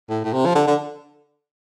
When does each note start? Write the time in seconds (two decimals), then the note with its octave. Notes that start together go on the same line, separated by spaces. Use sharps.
0.10 A2
0.24 A2
0.33 C3
0.46 F3
0.55 D3
0.67 D3